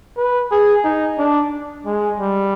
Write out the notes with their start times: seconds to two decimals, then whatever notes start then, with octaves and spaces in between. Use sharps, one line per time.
0.17 B4
0.51 G#4
0.84 D#4
1.18 D4
1.86 G#3
2.19 G3